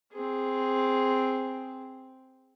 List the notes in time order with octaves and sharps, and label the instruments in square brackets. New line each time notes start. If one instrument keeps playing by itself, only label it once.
[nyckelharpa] C4 G#4